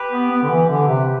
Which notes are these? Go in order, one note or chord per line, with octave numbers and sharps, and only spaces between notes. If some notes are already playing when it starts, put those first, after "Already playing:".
Already playing: G4 B4
B3
B3
D3
E3
D3
C3